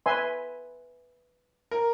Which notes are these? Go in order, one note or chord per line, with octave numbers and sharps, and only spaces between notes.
B4 E5 G#5 C6
A#4